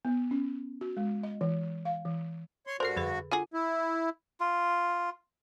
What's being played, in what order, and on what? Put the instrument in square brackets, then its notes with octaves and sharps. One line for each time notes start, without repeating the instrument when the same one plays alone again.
[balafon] B3
C#4
F#4
G#3
D#5
E3
F5
E3
[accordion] C#5 C6
[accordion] G2 F#4 [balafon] A4 [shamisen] A#4 D5 [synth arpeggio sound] C5 C7
[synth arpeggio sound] F2 [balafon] D3 G#4 B4
[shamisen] D3 F#4 G#4 [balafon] F4
[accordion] E4
[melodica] F4